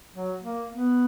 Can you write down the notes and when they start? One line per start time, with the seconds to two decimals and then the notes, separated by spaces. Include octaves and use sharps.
0.14 F#3
0.42 A#3
0.71 B3